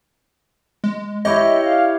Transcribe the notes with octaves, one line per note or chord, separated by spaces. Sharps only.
G#3
E4 G4 C#5 D#5 E5
F5